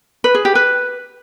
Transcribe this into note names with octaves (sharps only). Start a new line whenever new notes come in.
B4
G#4
G4
B4